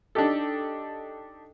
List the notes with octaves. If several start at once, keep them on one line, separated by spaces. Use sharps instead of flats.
D4 D#4 G4 A4